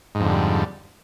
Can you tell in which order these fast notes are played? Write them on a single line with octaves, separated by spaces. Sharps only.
G#2 F2 D3 G3